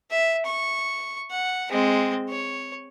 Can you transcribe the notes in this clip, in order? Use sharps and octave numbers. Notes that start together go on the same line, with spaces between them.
E5
C#6
F#5
G#3 C4
C#5